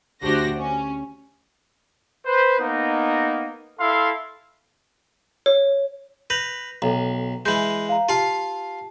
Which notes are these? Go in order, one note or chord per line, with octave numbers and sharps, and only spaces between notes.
D2 D4 F#4 G4 C5 A#6
C#4
B4 C5
A#3 B3 D#4
E4 A4 F5 C6
C#5
B4 G6 A#6 F7
B1 A4 G5 A#5
E3 G#3 B5 G6
F5 A#5
F4 G4 F5 A5